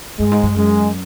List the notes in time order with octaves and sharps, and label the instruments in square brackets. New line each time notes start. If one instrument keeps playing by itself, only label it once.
[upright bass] G2 [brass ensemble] G#3
[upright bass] G#2
G2
[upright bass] F#2 [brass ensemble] G#3